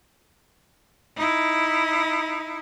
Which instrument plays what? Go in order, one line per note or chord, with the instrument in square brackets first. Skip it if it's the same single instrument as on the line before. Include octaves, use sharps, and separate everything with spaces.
[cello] D#4 E4